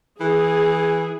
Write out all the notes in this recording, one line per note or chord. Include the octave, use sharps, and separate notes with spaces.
E3 G#4